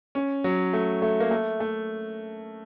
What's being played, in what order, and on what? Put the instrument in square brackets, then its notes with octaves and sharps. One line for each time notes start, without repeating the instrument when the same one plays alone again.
[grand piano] C#4
F#3
A3
A3
A#3
A3
A3